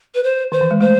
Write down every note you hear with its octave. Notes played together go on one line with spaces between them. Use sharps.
B4
C5
D#3 C5
E3
G#3
A3 C5